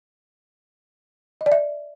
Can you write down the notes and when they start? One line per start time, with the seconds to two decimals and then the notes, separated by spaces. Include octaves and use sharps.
1.41 D#5
1.46 D5
1.52 E5